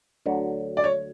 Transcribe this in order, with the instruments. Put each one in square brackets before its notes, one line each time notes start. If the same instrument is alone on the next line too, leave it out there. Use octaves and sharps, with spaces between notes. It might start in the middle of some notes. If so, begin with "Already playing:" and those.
[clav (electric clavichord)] D2 D3 F#3
[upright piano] D5
C#5